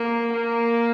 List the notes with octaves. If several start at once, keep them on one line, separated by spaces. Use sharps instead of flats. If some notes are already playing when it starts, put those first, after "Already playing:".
Already playing: A#3
A#3